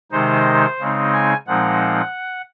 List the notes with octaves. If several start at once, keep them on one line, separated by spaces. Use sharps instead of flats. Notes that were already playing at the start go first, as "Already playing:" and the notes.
C3 D#3 G#3 D#4 C5
C#3 G#3 C4 D#4
G#5
A#2 F3 G#3 C4 D#4 F#5